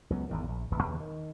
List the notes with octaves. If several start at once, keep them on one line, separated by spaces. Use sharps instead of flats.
C#2 F#3 B3
G#1 E2 D#3
A#1
D#1 G#1 D2 E3
D#2 C#3 E3
D#3